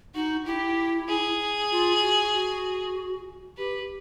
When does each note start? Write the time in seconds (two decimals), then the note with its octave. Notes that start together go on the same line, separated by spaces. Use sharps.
0.15 D#4 F#4
0.46 E4 G4
1.08 G#4
1.71 F4
2.02 F#4
2.33 F#4
3.57 G4 B4